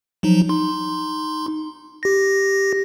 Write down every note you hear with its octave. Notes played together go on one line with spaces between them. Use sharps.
F3 F#3 D#4
D#4 C6
G4 A#6